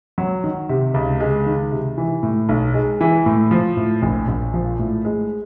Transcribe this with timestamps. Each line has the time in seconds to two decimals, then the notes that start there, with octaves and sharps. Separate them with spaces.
0.18 F#3
0.44 D#3
0.69 C3
0.94 C#2
1.20 G#3
1.46 D#3
1.72 C3
1.98 E3
2.23 A2
2.49 B1
2.74 G#3
3.01 E3
3.26 A2
3.51 F3
3.77 A2
4.02 A#1
4.28 A#1
4.54 F3
4.79 A2
5.05 G#3